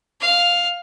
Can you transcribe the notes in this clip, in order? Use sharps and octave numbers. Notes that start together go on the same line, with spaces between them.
F5